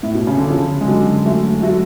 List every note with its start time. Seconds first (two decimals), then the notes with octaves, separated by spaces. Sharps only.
0.03 A2
0.15 B2
0.27 C#3
0.38 D3
0.50 C#3 F3
0.81 G#3
0.88 D3 F#3
1.25 F#3 A3
1.63 F#3 A3